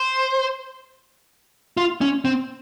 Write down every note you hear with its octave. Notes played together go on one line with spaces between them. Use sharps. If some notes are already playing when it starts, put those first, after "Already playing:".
Already playing: C5
F4
C#4
C4